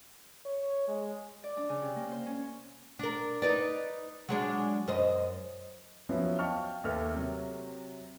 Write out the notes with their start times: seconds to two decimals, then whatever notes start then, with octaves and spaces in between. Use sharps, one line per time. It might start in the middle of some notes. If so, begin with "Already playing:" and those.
0.46 C#5
0.88 G#3
1.44 D5
1.57 D4
1.69 C#3
1.82 C3
1.96 A#3
2.12 C5
2.26 C#4
2.99 D4 A#4
3.42 D#4 B4 D5
4.29 F#3 G#3 D4
4.88 F#2 C5 D#5
6.09 F3 F#3 B3 C#4 E4 F#4
6.39 D#5 F5 G5 A5 C#6 F6
6.84 D#2 A3 A4 B4 F6
7.14 C3 F#3